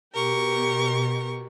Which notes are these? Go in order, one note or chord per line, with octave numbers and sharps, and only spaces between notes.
B2 G4 A#4 C#6